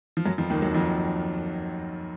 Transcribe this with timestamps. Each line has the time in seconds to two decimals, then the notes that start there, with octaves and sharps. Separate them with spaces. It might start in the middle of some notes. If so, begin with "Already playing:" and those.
0.17 F3
0.25 F#2 F#3
0.38 F2 F3
0.50 D#2 D#3
0.62 F#2 F#3
0.74 F2 F3